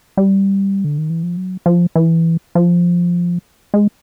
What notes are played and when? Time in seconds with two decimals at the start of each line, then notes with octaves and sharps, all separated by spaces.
0.17 G3
0.84 D3
0.98 D#3
1.10 E3
1.23 F3
1.37 F#3
1.66 F3
1.96 E3
2.55 F3
3.74 G#3